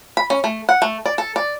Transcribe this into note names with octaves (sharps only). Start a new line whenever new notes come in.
B5
C#4
A3
F#5
A3
D5
A4
D5